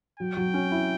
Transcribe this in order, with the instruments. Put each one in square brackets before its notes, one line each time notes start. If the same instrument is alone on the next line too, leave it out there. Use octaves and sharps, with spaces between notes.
[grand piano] F#3 [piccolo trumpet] G5
[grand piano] F#3
C#4
E4